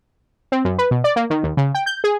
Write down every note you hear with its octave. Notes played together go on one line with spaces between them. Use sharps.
C4
F#2
B4
B2
D5
A#3
D#3
D#2
C#3
G5
G6
G#4